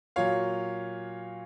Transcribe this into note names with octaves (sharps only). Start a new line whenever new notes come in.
A#2 F#3 C#5 F5